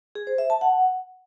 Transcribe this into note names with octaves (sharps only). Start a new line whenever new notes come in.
G#4
C5
E5
A5
F#5